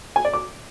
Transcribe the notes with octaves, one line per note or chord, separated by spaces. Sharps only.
G#5
D5
D6